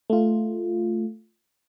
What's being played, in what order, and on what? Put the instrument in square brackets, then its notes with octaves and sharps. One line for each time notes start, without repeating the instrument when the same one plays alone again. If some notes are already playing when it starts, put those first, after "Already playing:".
[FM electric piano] A3 F4